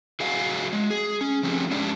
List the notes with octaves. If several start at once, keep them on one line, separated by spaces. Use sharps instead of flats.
F#3 G#4 D#5 F5 F#5 G#5
G#3
G#4
C#4
F3 A3 C4 G4
G#3 C#4 D4 G4 D5